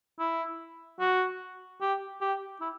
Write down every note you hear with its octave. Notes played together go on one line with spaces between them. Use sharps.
E4
F#4
G4
G4
E4